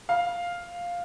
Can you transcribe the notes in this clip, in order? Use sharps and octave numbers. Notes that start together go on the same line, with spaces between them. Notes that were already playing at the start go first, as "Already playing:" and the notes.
F5